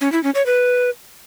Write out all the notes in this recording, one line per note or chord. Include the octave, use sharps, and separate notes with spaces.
C#4
E4
C#4
C#5
B4